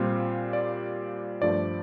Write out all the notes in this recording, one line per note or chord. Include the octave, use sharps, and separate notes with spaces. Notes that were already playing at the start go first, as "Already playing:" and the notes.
Already playing: A#2 G3 C4 F4
D5
G2 F3 A3 D5